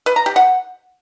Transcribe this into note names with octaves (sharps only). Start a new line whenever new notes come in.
B4
A#5
G4
F#5